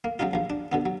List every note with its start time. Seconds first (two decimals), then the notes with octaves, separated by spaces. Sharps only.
0.04 A#3
0.19 F#3 G#3 C#4 D#4 F4
0.33 A#1 F3
0.50 D4
0.72 B2 D3 B3
0.86 F#3